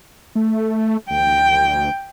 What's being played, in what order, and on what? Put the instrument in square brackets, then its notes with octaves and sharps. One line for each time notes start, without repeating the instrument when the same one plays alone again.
[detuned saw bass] A3
[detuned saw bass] D2 [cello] G5